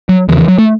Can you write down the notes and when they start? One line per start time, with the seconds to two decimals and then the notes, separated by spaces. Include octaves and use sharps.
0.09 F#3
0.28 E2 C#3 E3
0.38 E3
0.48 F#3
0.58 A3